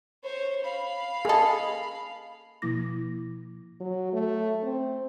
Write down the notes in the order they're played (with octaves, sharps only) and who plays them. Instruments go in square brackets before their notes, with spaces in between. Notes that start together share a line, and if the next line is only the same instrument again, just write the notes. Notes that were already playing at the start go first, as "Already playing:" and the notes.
[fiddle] C5 C#5
F5 B5
[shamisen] A#3 A4 [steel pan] G#4 D#5
[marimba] B2 F3 A#3 E4 D6 A#6
[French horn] F#3
A3
C4